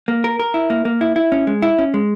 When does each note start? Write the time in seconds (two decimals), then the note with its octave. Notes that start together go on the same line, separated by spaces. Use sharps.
0.08 A#3
0.24 A#4
0.39 A#4
0.54 E4
0.70 A#3
0.85 A#3
1.01 E4
1.16 E4
1.32 C#4
1.47 G#3
1.62 E4
1.79 C#4
1.94 G#3